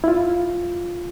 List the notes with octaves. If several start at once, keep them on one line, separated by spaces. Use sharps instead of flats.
E4
F4